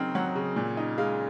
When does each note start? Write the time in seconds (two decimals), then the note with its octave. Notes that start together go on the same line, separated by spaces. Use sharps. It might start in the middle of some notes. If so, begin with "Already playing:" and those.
Already playing: C#3 F#3 C4 D#4 A#4
0.15 F#3 F#5
0.35 C#3
0.56 A#2
0.77 D#4
0.98 G#3 F5